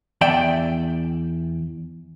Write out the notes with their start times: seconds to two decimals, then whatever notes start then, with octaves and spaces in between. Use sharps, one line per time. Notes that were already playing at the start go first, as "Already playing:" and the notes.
0.21 E2 D5 E5 G5